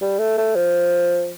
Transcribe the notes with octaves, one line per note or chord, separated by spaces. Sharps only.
G3
A3
A3
F3